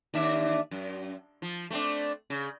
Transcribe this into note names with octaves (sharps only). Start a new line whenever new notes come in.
D#2 D4 E5
F#2
F3
A3 C4 D4
C#3